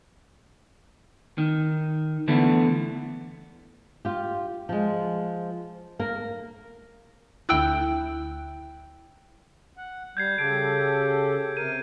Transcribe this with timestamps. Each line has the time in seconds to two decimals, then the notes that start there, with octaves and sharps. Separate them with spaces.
1.38 D#3
2.28 D3 E3 A3 B3
4.05 F4 G4
4.69 F3 G#3
5.99 A#3 A#4
7.49 D2 E4 G5 E6 F#6
9.77 F#5
10.17 G3 G6 G#6 C7
10.38 C#3 G4 A4 D7
11.57 C3 A#4 D#7